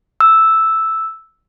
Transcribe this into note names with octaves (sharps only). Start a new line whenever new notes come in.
E6